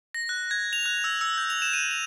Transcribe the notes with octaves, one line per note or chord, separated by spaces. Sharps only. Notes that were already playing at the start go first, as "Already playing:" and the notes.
A#6
F#6
G#6
F7
F#6
E6
E6
G6
F7
E7
D#7
F7